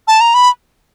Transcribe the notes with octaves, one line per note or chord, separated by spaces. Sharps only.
A5
A#5
B5